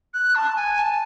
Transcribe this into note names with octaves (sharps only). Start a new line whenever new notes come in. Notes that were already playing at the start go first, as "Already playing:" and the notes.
F#6
A5
G#5
A5